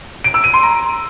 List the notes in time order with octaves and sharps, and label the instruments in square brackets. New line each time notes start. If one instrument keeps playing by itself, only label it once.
[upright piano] D7
E6
D#7
C6
A#5